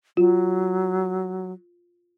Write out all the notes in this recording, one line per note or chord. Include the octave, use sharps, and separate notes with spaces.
F#3 F4